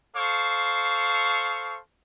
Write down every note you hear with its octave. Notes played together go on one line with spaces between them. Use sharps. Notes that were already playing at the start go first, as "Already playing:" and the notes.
A4 C5 F5 C#6